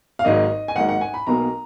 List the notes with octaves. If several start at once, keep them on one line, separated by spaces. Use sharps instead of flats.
F5
G#1 G#2 F#3 A#3 D#5
G#5
G#1 G#2 F#3 A#3 F#5
F#5
G#5
B5
B1 B2 F#3 A#3 A#5